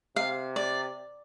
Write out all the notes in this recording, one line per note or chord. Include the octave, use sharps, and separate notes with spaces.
C3 F5
D5